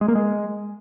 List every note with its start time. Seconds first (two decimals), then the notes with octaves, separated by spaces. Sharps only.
0.01 G#3
0.08 A#3
0.15 G#3